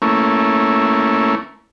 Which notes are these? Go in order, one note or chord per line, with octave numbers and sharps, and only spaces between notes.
A3 A#3 C#4 E4